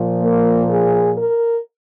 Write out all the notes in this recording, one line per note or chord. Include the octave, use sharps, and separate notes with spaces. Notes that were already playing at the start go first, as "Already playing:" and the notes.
Already playing: A#2 F3
A#3
G#4
A#4